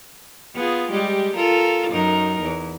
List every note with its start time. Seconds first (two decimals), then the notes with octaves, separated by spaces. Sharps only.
0.55 B3 F4 G#4
0.91 G3 G#3 G4
1.36 F4 A4 A#4
1.90 F#2 D#4 A#4
2.41 E2